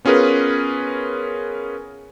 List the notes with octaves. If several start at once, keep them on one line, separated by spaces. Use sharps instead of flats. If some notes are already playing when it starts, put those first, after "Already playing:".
B3 C#4 F4 G#4 A#4 B4